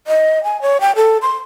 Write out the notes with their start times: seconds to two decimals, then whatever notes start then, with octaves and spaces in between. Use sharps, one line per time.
0.07 D#5
0.44 G#5
0.62 C#5
0.81 G5
0.96 A4
1.22 C6